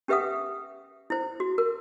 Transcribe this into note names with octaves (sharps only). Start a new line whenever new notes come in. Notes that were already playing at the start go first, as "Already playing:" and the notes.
C#4 G4 B4 E5 F#5 D#6
E4 C5
F#4
A#4